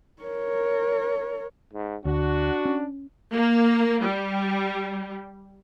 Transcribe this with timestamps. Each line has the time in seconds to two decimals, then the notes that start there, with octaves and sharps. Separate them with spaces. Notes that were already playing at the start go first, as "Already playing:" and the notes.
0.22 A#4 C#5
1.73 G#2
2.05 D2 D4 F#4
2.65 C#4
3.34 A#3
4.02 G3